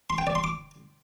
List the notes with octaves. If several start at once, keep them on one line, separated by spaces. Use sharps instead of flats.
C6
G5
D5
C6
D6